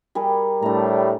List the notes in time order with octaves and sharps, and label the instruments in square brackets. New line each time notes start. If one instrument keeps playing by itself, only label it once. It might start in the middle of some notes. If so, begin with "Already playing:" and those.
[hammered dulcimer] G3 G#4 A#4
[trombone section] A2 G3 [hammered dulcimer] D4 A#5